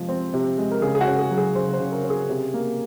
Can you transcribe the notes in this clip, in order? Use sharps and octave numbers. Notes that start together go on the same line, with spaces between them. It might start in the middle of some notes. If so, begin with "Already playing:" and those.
Already playing: C3 F3 G#3
C4
C3
G#3
A#4
C#3 G#4
G#4
F#4
C#4
G#4
F#3
G#4
C#3 C5
C5
C#3
A#4
C#4
G#4
C3
A#3